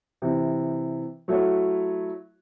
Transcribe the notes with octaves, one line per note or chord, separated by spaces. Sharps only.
C3 E3
F#3 A3 E4 F#4 C#5